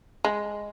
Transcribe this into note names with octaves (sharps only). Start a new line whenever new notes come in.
G#3